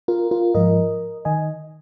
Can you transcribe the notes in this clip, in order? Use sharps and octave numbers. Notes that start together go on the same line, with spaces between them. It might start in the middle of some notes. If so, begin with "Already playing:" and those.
F4 A#4
F4 A#4
G#2 F3 A#4 D#5
D#3 D#5 G#5